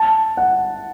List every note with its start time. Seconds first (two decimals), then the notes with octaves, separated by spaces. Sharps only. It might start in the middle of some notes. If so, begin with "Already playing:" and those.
Already playing: A5
0.37 F#5